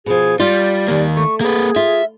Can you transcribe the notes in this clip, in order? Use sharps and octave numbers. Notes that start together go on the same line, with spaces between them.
B2 F3 G#4
G3 F4 D5
D#3 G3 A#3
A3 C#6
A#3 G#4 B4
F4 E5